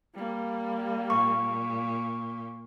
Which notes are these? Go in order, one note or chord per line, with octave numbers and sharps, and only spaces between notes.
G3 A#3
A#2 C#6